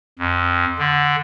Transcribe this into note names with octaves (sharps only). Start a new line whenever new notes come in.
F2
D3